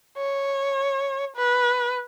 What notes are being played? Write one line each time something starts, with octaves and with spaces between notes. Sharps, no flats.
C#5
B4